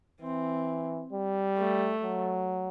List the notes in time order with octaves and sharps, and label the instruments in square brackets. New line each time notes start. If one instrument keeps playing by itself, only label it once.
[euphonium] E3 [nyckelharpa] C4
[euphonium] G3
[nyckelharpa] A3
[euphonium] F#3